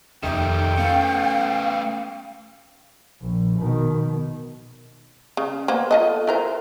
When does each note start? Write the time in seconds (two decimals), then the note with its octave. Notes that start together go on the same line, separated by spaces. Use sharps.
0.23 F1 A#2 D#3 G5
0.77 A3 B3 C#4 F5
3.22 A#1
3.59 B2 D#3
5.37 C#3
5.68 A#3 B3 C5
5.91 F4 A4 D#5
6.27 E4 A#4 C5